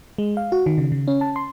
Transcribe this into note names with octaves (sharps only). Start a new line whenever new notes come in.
G#3
F5
F#4
D#3
C#3
C#3
C#4
A5
C6